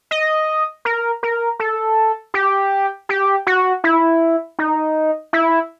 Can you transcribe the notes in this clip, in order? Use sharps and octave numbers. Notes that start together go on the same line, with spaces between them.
D#5
A#4
A#4
A4
G4
G4
F#4
E4
D#4
E4